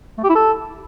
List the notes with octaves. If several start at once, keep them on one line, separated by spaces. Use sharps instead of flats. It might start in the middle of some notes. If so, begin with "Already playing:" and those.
A3
G4
E4
A4